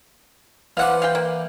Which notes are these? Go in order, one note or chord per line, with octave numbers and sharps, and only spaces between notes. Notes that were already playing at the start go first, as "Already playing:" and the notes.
E3 C5 D5 F5 F#5
F5 G5
A#3